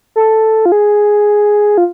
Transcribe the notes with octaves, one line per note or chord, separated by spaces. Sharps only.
A4
F4
G#4
F4